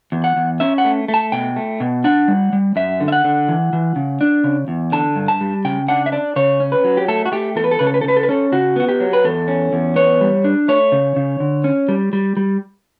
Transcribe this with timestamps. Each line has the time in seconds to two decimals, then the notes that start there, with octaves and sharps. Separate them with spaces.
0.12 E2
0.24 F#5
0.36 E2
0.60 C#4 E5
0.78 F#5
0.85 A3
1.08 A3
1.14 A5
1.32 B2 G5
1.56 A3
1.80 B2
2.04 D4 F#5
2.28 G3
2.53 G3
2.76 F#2 E5
3.00 D3
3.08 E5
3.12 F#5
3.24 D3
3.48 E3
3.73 E3
3.96 C#3
4.21 D4
4.44 C#3
4.68 E2
4.92 D3 A5
5.16 G2
5.28 A5
5.41 G3
5.65 C#3 G5
5.88 D4 F#5
6.06 E5
6.12 D4 D5
6.36 C#3 C#5
6.60 C#4
6.72 B4
6.84 F#3
6.97 G4
7.08 A3 A4
7.26 F#4
7.32 A3 G4
7.56 E2 A4
7.64 B4
7.71 A4
7.79 C#3 B4
7.87 A4
7.94 B4
8.01 A4
8.04 C#3 B4
8.17 A4
8.23 B4
8.29 C#4 A4
8.52 C#3 F#4
8.76 B3 F#4
8.89 G4
9.00 F#3
9.13 B4
9.24 E2 A4
9.48 C#4
9.73 E2
9.96 B3 C#5
10.21 G3
10.44 D4
10.68 A3 C#5
10.92 C#3
11.16 C#3
11.40 D3
11.64 C#4
11.89 G3
12.13 G3
12.37 G3